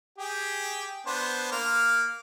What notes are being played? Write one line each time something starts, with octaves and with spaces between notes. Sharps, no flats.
G4 G#4 G5
B3 D4 C5
A#3 F5 F6